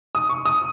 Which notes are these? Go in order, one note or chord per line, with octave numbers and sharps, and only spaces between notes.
D#6
C#6
D#6